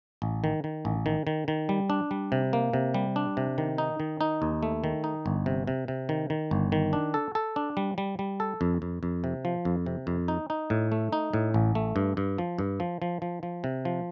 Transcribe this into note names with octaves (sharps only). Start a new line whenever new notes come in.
A1
D#3
D#3
A1
D#3
D#3
D#3
G3
D4
G3
C3
A#3
C3
G3
D4
C3
D#3
D#4
D#3
D#4
D#2
A3
D#3
D#4
G1
C3
C3
C3
D#3
D#3
G1
D#3
D4
A4
A4
D4
G3
G3
G3
A4
F2
F2
F2
C3
F3
F2
C3
F2
D#4
D#4
A2
A3
D#4
A2
A1
A3
G2
G2
F3
G2
F3
F3
F3
F3
C3
F3